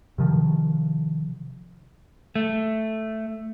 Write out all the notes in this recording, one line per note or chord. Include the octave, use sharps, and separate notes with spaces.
C3 D#3 F3
A3